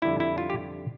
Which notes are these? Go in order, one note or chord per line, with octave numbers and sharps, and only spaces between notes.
F2 D3 G3 E4
E4
F4
G4